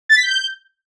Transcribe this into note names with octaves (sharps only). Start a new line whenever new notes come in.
A6
B6
G6